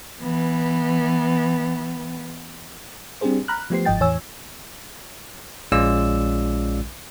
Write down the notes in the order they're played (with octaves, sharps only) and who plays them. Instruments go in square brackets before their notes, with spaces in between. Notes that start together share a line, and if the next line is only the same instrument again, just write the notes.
[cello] E3 B3
[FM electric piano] G3 C4 D4 G4 G#4 C5
A#5 B5 F6 F#6
F3 A3 B3 G4 C5 C7
G1 G#2 F3 D#5 G5 A6
E2 A2 E3 C#5 G#5 E6
[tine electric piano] A#1 G#3 C#4 F4 D5 E6